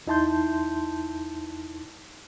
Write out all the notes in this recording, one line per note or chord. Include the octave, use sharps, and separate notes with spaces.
E2 D#4 E4 A5 C6 G6